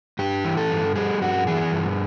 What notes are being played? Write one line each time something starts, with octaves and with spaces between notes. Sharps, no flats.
G2 G4
E3
A4
G2
G3 G#4
G2 F#4
E3 G#4
G2